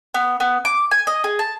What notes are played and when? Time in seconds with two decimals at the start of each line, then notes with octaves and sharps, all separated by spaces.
0.14 B3
0.40 B3
0.65 D6
0.91 G#5
1.07 D#5
1.24 G#4
1.39 A5